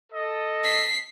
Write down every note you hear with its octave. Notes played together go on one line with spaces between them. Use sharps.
A4 D#5
B6 C7